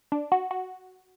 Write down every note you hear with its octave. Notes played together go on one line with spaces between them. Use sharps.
D4
F#4
F#4